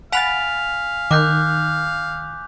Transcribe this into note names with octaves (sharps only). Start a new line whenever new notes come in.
F5 F#5 G#5 B5 A6 B6 F7
D#3 D6 F#6 G6